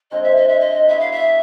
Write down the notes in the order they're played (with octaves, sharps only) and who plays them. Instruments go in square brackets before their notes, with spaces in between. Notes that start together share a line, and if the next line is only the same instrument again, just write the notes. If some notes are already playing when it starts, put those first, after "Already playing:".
[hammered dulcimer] D3 F3 G#3 C4 [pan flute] D#5
[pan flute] E5
D#5
E5
D#5
[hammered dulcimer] F#3 B3 E4 G#4 [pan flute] E5
[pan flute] F5
E5